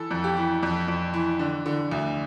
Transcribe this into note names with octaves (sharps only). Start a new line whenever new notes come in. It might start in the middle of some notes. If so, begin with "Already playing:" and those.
Already playing: E3 A4
F2
G4
E3
F2
F2
E3
D3
D3
D2